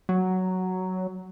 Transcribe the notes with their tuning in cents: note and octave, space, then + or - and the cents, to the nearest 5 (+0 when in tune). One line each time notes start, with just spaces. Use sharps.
F#3 +5